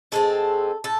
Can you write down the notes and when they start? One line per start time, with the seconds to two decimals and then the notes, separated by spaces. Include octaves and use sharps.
0.12 A2 G#3 C4 A4
0.84 A2 A4